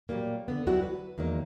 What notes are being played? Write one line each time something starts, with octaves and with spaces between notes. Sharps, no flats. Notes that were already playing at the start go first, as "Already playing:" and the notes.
A#2 C#3 F#3 G3 A#3
D3 B3
D2 F#3 G3 E4 F#4 F#5
B4
E2 D#3 F#3 G#3 A#3